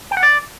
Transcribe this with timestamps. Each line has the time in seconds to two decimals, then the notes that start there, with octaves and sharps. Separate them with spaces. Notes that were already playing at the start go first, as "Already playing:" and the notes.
0.11 G5
0.17 F#5
0.23 D5